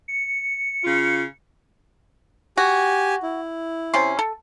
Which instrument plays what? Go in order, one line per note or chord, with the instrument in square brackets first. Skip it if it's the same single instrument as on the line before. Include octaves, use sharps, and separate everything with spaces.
[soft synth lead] C#7
[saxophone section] C#3 F4
[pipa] F#4 [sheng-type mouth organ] G4 G#5
[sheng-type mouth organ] E4
[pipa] C3 C#4 C6
A4